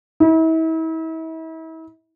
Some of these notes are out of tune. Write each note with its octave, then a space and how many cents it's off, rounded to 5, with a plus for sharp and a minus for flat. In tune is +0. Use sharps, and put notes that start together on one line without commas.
E4 -40